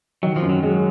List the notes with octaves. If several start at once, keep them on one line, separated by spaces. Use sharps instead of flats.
D#3 F#3
F3
F#2
F#3
F#3 G#3